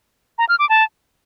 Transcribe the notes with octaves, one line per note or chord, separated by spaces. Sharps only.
A#5
F6
D6
A5